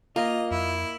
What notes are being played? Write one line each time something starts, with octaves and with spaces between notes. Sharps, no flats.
A#3 F4 D#5
F2 E4